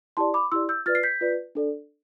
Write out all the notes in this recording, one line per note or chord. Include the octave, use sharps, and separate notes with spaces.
E4 G4 D5 A5 C6
B5 D6
E4 G4 D5 C6 E6
E6 G6
F4 B4 D5 F6 A6
C7
G6 B6
F4 B4 D5
D4 A4 D5